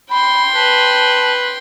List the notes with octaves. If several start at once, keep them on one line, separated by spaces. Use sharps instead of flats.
G5 B5 C6
B4 A5